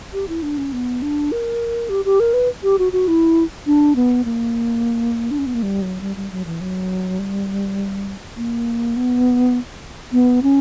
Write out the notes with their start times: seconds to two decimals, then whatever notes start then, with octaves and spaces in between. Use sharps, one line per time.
0.13 G4
0.29 E4
0.42 D4
0.58 C#4
0.72 B3
1.02 D4
1.32 A#4
1.89 G4
2.05 G4
2.20 A#4
2.34 B4
2.63 G4
2.79 F#4
2.93 F#4
3.08 E4
3.66 D4
3.96 B3
4.25 A#3
5.31 D4
5.39 C#4
5.46 B3
5.54 A#3
5.63 G3
5.82 F#3
6.01 G3
6.16 G3
6.32 F#3
6.46 E3
6.61 F#3
7.19 G3
8.37 A#3
8.96 B3
10.12 B3
10.43 C#4